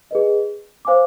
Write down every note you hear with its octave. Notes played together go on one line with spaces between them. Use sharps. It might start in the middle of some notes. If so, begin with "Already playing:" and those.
G#4 B4 D#5
C5 F5 G#5 D6